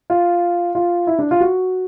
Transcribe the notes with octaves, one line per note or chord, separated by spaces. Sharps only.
F4
F4
E4
D4
F4
F#4